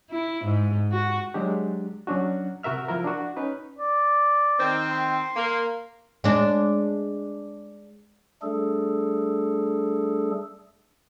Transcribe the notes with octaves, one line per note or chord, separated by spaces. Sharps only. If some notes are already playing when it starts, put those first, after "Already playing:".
E4
G#2
F#4
F#3 G#3 D4 G4
F#3 C#4 D4 F#4
C3 F#4 A#4 E5 F6
F3 E4 A#4
D4 F#4
C#4 D#4 B4
D5
D#3 C4
C6
A#3
G#3 D4
G3 A3 D4 G#4 A4